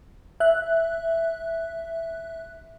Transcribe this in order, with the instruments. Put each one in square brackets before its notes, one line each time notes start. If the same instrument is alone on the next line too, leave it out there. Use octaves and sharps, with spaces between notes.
[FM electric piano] E5 F#6